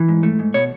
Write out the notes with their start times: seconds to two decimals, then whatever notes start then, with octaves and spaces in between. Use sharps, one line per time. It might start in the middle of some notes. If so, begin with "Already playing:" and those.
Already playing: E3
0.08 G#2
0.23 A3
0.39 G#2
0.54 B2 C#5